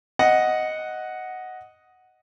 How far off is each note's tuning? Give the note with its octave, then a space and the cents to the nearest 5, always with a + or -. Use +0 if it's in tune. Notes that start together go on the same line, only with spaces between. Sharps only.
D#5 +5 F#5 +0